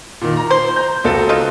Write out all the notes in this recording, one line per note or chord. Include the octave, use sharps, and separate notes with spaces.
A#2 D#3
A#5
C5
A#5 G6
C#2 F#4 A4
D#4 F4